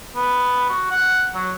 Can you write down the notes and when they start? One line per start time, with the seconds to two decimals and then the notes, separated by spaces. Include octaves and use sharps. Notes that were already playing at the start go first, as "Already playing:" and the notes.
0.16 B3
0.69 F#4
0.91 F#5
1.35 F#3